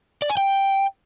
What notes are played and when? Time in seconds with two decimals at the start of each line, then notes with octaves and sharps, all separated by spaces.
0.22 D5
0.30 G#5
0.37 G5